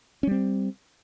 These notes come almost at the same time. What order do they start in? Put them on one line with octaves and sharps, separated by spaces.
C#4 G3 C4